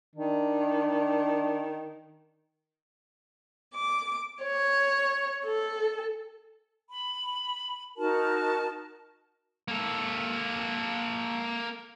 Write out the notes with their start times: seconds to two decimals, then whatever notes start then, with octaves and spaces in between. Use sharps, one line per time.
0.15 D#3 D4
3.75 D6
4.42 C#5
5.46 A4
6.89 B5
7.98 D#4 F#4 A#4 A5
9.68 A#3 A4